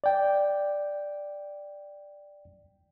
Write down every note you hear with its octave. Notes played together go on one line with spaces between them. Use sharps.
D5 G5